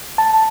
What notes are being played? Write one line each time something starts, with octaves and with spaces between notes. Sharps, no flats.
A5